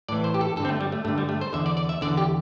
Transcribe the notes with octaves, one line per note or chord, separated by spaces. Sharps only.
A2 E3 D5
C5
G4
A4
G2 D3 A4
C4
A3
G3
A3
G2 D3 A3
G3
A3
C5
E2 D3 E5
D5
D5
E5
E2 D3 D5
G4